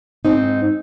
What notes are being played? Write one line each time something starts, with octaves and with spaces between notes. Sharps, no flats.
G#2 C4 D#4